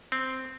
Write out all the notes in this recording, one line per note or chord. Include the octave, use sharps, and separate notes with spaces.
C4